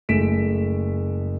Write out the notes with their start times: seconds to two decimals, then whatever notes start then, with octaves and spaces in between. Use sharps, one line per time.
0.09 F#1 G#3 A3 B6 D7 E7